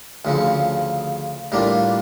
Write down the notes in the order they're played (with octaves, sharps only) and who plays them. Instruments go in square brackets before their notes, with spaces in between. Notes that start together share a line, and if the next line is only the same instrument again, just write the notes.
[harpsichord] D2 C#3 F3
A2 G3 A#3 D4 F4